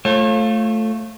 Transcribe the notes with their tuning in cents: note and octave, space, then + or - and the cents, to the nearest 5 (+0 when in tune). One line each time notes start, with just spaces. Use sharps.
A3 +0 F4 +0 C#5 -40